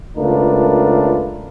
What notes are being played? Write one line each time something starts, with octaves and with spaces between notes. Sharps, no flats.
C#2 A3 D4 F4 A#4 B4